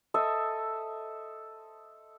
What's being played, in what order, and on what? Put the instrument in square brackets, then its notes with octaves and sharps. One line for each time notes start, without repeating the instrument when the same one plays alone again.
[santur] A4 C5 D#5 E5